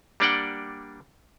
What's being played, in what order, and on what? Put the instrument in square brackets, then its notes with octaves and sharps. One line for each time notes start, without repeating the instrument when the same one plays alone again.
[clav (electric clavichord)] G3 A#3 D4 D5 F#5 G5